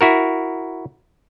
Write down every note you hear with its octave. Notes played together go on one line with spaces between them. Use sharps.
E4 F#4 A#4